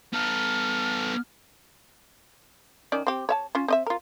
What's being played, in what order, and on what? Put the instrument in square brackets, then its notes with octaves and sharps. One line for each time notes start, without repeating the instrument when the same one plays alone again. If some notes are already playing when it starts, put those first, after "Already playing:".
[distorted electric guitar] B3 A4 [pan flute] F6
[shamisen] D#3 C#4 D5
C4 G4
C#5 E5 A5
C#4 F4
C4 D#5 E5
F4 A#4